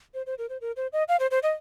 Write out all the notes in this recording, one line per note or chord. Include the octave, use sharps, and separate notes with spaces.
C5
C5
A#4
C5
A#4
C5
D#5
F5
C5
C5
D#5